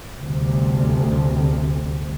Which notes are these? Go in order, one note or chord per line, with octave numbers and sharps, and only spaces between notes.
G1 D2 C3